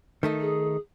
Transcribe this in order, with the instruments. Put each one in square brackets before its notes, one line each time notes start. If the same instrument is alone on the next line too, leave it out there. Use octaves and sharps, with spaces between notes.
[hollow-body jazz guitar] D#3 A3 D#4
[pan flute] G#4